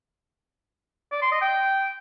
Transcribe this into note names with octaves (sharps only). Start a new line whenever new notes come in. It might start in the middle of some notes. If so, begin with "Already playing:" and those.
D5
C6
D#5
G5